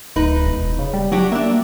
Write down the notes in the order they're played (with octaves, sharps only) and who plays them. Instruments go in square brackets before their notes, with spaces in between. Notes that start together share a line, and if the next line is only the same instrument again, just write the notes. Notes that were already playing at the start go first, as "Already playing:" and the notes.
[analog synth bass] D1 [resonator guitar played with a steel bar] D#4 B4
[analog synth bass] E1
C#3
G3
[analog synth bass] F#3 [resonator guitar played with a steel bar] D4 F#4 G4
[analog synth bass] A#3 [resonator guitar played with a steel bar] D4 E5